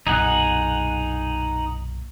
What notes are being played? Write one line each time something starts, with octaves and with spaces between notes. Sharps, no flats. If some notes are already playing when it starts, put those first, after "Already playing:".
B1 F#2 A#2 D#4 G#4 F#5